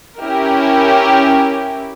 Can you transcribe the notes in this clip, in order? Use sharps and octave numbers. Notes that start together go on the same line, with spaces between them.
C#4 E4 G4 A#4